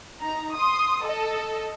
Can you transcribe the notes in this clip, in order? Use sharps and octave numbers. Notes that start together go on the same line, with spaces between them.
D#4 A#5
C6 D#6
A4 D#5